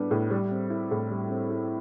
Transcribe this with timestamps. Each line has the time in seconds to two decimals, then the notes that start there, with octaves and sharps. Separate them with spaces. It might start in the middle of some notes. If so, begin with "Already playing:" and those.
Already playing: A2 G3 B3 D4
0.11 A2
0.30 G3
0.51 C4
0.70 E4
0.91 A2
1.10 G3
1.30 C4
1.50 E4